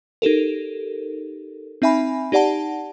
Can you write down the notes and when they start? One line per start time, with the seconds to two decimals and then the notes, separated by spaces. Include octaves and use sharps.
0.22 D#4 G4 A4 A#4
1.82 C4 D#4 E5 G#5 B5
2.32 D#4 G4 D5 F#5 A5